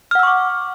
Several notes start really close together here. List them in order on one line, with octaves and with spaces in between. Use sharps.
F6 F#5 E6 C#6 D6